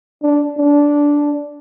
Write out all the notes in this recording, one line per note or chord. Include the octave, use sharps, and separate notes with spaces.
D4
D4